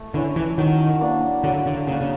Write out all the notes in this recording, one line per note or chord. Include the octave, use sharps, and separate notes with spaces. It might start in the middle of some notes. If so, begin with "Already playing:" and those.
Already playing: A3
D3 C#4 E4
E3
D#3 F#3
A#3 D4
D3 F#3
D3
C#3 A#3
D4
C#3